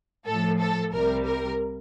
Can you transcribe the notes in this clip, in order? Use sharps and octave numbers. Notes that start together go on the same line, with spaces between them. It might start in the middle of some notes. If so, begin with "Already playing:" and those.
A2 F3 A4
A4
C2 C3 G3 A#4
A#4